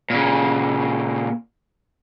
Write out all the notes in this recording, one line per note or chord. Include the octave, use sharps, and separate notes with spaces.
A#2 C#3